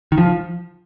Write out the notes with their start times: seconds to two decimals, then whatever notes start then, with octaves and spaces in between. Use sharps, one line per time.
0.12 D#3
0.18 F3